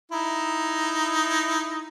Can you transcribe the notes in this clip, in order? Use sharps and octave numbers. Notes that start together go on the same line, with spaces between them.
D#4 E4